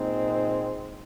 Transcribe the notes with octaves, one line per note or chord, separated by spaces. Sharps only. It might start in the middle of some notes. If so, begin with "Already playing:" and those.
Already playing: A#2 G#3 C4 D#4